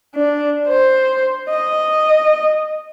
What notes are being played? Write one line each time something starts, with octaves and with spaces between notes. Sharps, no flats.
D4
C5
D#5